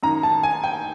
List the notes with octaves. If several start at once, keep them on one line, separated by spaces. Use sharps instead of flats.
F#2 D#3 A#5
A5
G#5
G5